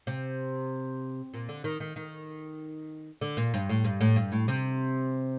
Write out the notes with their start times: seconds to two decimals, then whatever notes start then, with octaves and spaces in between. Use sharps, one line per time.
0.07 C3
1.34 A#2
1.49 D3
1.64 D#3
1.80 D#3
1.96 D#3
3.21 D3
3.37 A#2
3.54 G2
3.69 A2
3.84 G2
4.01 A2
4.16 G2
4.32 A2
4.48 C3